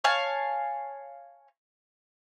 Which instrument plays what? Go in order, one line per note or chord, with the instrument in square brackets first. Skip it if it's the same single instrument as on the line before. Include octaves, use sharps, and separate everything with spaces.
[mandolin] C#5 F5 G#5 A5